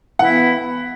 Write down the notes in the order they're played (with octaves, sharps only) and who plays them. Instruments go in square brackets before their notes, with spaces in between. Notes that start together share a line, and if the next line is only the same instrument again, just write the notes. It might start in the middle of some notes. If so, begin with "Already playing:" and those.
[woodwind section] E3 B3 E4 [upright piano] F#5